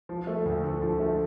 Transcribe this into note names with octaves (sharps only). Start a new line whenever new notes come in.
F3
A3
D2
D3
F3
A3